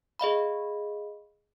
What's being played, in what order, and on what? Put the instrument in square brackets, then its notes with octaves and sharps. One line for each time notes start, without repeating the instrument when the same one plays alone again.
[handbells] G#4 D#5 F5 B5